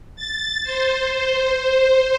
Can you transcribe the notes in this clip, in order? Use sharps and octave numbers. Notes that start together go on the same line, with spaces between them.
A6
C5